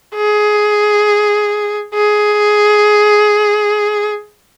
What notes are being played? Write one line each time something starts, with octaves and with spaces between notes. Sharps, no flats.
G#4
G#4